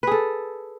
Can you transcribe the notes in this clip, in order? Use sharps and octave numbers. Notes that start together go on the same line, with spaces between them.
G#4 A4 B4